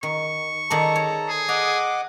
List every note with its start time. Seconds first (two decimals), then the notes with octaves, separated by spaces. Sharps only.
0.03 D#3 C#6
0.70 D#3 G#4 A4 D5 A5 A#5
0.96 C#5
1.29 G#4
1.49 D#5 F#5 A#5 D6